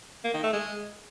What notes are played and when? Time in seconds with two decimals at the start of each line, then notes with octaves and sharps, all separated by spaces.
0.24 A#3
0.34 D#3
0.43 A3
0.53 G#3